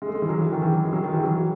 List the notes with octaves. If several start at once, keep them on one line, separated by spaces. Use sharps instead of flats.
G#3
A3
G#3
E3
F#3
E3
D#3
E3
F#3
G#3
F#3
D#3
E3
F#3